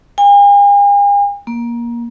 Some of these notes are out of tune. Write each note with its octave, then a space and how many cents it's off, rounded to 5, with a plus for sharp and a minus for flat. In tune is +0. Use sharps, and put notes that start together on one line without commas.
G#5 -45
A#3 +20